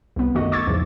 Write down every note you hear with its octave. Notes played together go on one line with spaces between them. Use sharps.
C2 B3
G1 F#2 D#3 A3 F#4 D#5
C#6 D6 E6 G#6 A6
B1 E2 G#2 C#3 F3